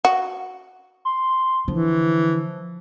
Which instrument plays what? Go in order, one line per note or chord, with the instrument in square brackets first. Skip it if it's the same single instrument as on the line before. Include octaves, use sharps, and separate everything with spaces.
[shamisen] F#4
[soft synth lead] C6
[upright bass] D3 [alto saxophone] E3 [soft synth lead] F3